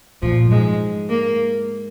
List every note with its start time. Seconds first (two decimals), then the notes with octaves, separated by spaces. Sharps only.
0.22 A#2 F3
0.45 F#2
0.51 G#2 G#3
1.09 A#3